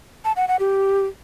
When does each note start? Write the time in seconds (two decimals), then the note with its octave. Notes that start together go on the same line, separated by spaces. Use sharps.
0.25 A5
0.36 F#5
0.48 F#5
0.60 G4